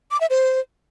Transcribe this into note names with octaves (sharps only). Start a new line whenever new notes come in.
D6
E5
C5